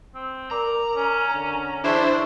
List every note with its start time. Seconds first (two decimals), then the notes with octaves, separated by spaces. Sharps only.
0.15 C4
0.51 A#4 D5 A#5
0.97 C#4
1.31 D3
1.84 E3 D4 E4 G#4 C5 C#5